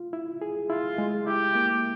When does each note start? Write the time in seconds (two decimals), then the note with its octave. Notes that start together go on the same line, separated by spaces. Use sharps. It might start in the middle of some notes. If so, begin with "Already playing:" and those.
Already playing: F4
0.13 E4
0.42 G#4
0.70 E4 F4
0.98 G#3
1.27 E4 G4
1.55 A#3